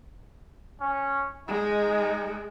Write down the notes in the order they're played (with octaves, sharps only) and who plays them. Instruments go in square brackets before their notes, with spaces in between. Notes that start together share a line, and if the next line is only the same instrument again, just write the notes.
[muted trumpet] C#4
[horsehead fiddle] G#3 [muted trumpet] D#4